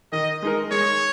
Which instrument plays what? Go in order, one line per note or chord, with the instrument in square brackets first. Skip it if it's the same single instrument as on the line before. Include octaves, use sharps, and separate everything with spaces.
[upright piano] D#3 [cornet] D#5
[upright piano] G#3 D#4 A#4
[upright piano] G#3 [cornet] C#5